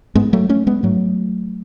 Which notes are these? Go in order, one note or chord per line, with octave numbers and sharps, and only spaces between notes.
G#2 G#3 B3
F#3 A3
A3 C#4
G#3 B3
G#2 F#3 A3